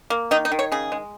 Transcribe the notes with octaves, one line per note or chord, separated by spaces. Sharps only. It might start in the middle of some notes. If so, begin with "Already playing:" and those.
A#3
D#3 D#4
D#4
D#3
C#5
C#3 G#4
G#3